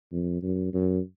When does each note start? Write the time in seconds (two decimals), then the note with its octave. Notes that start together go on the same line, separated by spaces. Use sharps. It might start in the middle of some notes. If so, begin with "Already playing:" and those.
0.12 F2
0.43 F#2
0.73 F#2